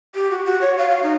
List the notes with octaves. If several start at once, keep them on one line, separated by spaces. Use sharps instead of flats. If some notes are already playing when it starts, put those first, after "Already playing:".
G4
F#4
F#4
C#5
F5
F5
D#4